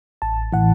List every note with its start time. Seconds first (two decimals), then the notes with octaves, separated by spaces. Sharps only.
0.22 A1 A5
0.53 A2 E3 F#5